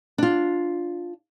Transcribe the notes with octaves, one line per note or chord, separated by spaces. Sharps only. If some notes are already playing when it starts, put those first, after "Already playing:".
D4 F4